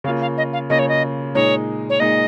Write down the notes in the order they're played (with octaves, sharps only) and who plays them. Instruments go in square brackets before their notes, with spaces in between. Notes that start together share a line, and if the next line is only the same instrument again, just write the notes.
[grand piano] C#3 [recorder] F5
[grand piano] A#3 F4
[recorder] F5
D#5
F5
[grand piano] C#3 A#3 F4 [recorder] D#5
[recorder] C#5
D#5
[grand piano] A#2 G#3 D#4 [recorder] C#5
[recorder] C#5
[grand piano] A#2 G#3 D#4 [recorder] D#5